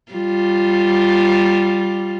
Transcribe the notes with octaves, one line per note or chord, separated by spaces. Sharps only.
G3 F4